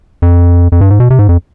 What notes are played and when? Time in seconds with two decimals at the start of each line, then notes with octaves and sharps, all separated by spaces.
0.22 F2
0.72 F2
0.81 G2
0.90 G#2
1.00 B2
1.10 C3
1.19 G#2
1.29 F2